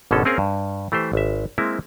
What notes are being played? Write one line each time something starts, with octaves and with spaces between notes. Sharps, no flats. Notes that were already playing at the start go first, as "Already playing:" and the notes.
G#1 B2 D3 C#4 A4
A#3 C4 C#4 G#4 A#4 F5
G2
E3 A3 G4 C5
G#1 E5
G#3 A#3 C4 E4